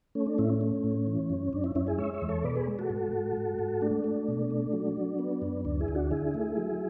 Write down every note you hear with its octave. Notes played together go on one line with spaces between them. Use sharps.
A3 C#4
D4
A2 C#4 E4
C#4
A3
A2
E3
F#2
F#2 D4
C#4 E4
F#2 C#4 E4
E4 G#4
G#3 C#5 E5
C#5 E5
E2
A4 C#5
B2 B4 D5
G#4 B4
G#3
F#4 A4
G#2
G#2
G#2
G#2
A3 D4
A3
B2
A3
F#3
F#3
B3
F#2
D2 D4
E4 G#4
D2
D4 F#4
D3 E4 G#4
A3
F#3